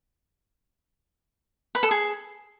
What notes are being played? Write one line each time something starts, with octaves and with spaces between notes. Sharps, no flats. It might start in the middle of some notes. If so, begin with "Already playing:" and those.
B4
A4
G#4